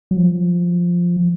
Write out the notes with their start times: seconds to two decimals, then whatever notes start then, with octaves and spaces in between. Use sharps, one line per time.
0.11 F#3
0.17 F3